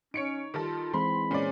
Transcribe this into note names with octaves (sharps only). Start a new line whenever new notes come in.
C#4 D#4 C#5 C#7 D7
D#3 G3 F4 A4
E3 G#3 C4 B5 C6
A#2 G#3 C#4 D5